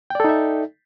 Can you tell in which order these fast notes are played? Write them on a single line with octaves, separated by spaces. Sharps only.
G5 D5 A4 D#4 E5